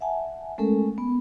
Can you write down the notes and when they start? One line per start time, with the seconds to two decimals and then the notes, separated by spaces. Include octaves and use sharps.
0.01 E5 F#5 G#5 A5
0.58 G#3 A3 C#4 A4 A#4
0.98 B3